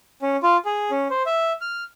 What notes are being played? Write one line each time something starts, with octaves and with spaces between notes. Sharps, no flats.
C#4
F4
G#4
C#4
C5
E5
F6